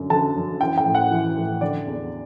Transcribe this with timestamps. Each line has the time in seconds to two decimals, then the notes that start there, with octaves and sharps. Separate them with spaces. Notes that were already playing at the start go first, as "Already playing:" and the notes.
Already playing: F#2 D3
0.10 D3 A5
0.36 F#2
0.61 E3 G5
0.78 G5
0.85 A2
0.95 F#5
1.11 E3
1.37 A2
1.61 D3 D5
1.86 E2